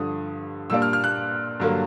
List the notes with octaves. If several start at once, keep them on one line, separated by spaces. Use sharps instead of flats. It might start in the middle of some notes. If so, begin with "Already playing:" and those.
Already playing: G2 D3 F3 D#6
A#2 G3 A#3 D4 E6
F6
F6
F#6
G2 D3 F#3 A#3